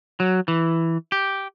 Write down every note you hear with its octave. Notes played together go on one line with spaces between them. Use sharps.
F#3
E3
G4